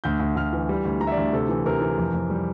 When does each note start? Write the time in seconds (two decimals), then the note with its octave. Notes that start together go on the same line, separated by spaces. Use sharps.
0.04 D2 G6
0.20 D2
0.36 D2 F6
0.53 E3
0.69 G3
0.85 D2
1.01 G3 A#5
1.07 E5
1.12 D5
1.17 D2
1.33 C3 A4
1.49 E3
1.66 C3 A#4
1.81 E3
1.98 F2
2.14 F2
2.30 G3